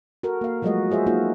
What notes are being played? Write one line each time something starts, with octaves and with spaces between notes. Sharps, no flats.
F#4 A4 A#4
A#3 F5
F3 F#3 G#3 A3 F#4 D#5
F4 G#4 C5 E5
A#3 D#4 F4 F#4 A#4